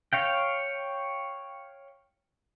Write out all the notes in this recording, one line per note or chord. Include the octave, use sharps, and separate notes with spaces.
C#5 F5 G5